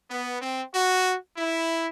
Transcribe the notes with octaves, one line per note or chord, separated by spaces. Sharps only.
B3
C4
F#4
E4